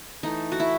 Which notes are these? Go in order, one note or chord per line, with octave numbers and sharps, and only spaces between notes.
E3 A3 D#4
F#4
E4